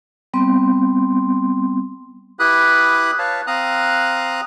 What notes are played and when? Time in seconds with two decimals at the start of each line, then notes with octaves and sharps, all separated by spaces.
0.34 G3 B3 C4 C6
2.40 E4 G4 B4 B5 D#6 F#6
3.19 B4 C#5 F5 A5
3.47 C4 F5 A#5 D#6 F#6